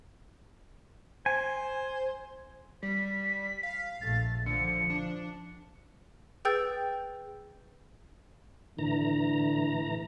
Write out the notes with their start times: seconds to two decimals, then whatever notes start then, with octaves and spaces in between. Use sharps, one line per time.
1.26 C5 G#5
2.83 G3 B6
3.63 F5
4.01 A#1 A3 A6
4.46 D3 F3 C#7
4.90 D4
6.45 G#4 B4 G5 E6 G6 A6
8.79 A2 D3 E3 A#5